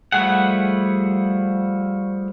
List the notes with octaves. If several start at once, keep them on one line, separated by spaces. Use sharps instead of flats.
F3 G3 A3 G#4 F#5